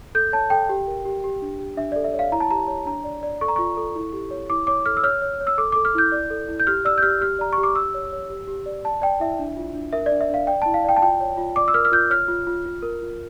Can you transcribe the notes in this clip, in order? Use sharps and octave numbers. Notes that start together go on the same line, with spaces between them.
A4 G6
C#5 A5
A4 G5
G4
A#4
G4
G4
D4
G4
D4 E5
A4 D5
E5
C#5
F5
E4 A#5
A5
G4 A#5
C#5
D4 A#5
D5
D5
A4 C#6
A#5
F4 C#6
A4
E4
G4
C#5
E4 D6
C#5 D6
A4 F6
E6
C#5 F6
C#5
C#5
E6
A4 D6
A4 D6
F6
E4 G6
D5
A4
E4
G6
G4 F6
D5 E6
G6
G4 F6
G4 F6
D5 A#5
C#6
G4
D6
G4 E6
C#5
C#5
G4
G4
D5
D5 A5
D5 G5
E4 E5
D4
F4
D4
A#4 E5
D5
D4
E5
D4 F5
D5 G5
E4 A5
F5
D5 G5
A5
F4 G5
C#5
F4
D5 D6
E6
A#4 F6
F6
F4 G6
C#5 F6
F4
F4
F4
A#4
F4